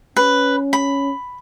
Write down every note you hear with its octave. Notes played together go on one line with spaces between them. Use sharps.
C#4 B4
B5